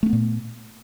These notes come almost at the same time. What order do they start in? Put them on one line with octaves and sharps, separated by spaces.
A3 C#4 B3 A#2